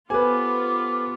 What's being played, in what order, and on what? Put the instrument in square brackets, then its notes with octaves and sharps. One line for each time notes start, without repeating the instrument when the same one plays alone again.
[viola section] B3 F4 [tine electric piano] G4 A4 C5 [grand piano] B4 G#5 [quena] D6